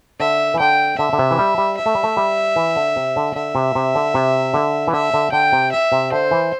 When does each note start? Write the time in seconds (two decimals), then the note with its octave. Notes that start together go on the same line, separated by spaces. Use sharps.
0.20 D3 E5
0.54 E3
0.60 D3 G5
0.98 D3 E5
1.13 D3
1.19 C3
1.31 E3
1.39 G3
1.58 G3
1.77 E5
1.86 A3
1.95 G3
2.03 A3
2.17 G3
2.56 E3
2.76 D3
2.96 C3
3.16 D3
3.35 D3 E5
3.55 C3
3.75 C3
3.95 D3
4.14 C3
4.54 D3
4.87 E3
4.93 D3 E5
5.14 D3
5.32 D3 G5
5.52 C3
5.72 E5
5.92 C3
6.12 D3 C5
6.31 E3